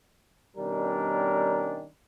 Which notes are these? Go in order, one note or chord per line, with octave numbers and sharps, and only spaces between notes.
B2 D#3 G3 C#4 D4 A#4